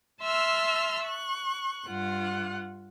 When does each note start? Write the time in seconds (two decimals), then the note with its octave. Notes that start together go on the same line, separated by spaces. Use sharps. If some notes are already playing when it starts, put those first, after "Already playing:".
0.22 E5 A5 C6 E6 F6
1.04 C#6 F#6
1.87 G2 F4 F#5